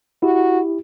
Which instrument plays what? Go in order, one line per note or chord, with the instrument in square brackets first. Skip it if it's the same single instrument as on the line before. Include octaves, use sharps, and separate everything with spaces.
[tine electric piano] E4 G4 [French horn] F#4